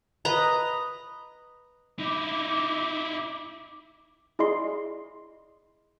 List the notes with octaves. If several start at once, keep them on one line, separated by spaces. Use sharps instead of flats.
B4 D#5 A#5
D#4 E4 D6
E4 G#4 D5 D#5 C6 C7